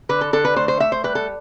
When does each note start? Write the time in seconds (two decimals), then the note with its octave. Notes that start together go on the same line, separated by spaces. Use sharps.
0.09 D3 B4
0.21 A4
0.33 D3 A4
0.45 B4
0.56 A3 C5
0.68 C5
0.80 A3 E5
0.92 C5
1.04 G3 B4
1.15 A4